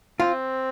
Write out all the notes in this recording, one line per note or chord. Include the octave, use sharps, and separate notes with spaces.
C4 F4